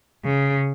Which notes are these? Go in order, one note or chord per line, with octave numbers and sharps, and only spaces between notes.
C#3